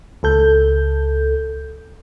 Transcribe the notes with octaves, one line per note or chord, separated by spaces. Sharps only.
C#2 A4 G6